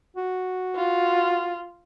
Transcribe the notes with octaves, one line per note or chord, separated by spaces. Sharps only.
F#4
F4